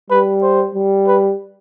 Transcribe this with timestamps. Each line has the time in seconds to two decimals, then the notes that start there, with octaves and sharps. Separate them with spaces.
0.10 G3 B4
0.42 C5
0.75 G3
1.07 B4